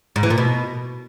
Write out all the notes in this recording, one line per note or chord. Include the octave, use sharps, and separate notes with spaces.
G#2
E3
A#2
B2